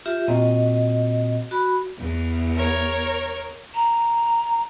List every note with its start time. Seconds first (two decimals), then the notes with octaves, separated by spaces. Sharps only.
0.06 F4 G4 E5
0.28 A#2 C4 F#4 D#5
1.51 F#4 B5
1.98 E2
2.55 A#4 C#5
3.75 A#5